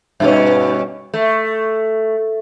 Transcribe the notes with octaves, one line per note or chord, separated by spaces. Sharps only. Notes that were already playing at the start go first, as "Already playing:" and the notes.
G2 B2 C#4
A3